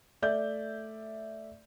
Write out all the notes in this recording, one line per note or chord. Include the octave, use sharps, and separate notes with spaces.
A3 D5 E5 G6